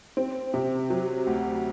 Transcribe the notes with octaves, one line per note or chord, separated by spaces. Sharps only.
C4
C3
F#3
D2